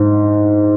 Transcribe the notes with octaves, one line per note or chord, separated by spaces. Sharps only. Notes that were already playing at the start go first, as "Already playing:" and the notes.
Already playing: G#2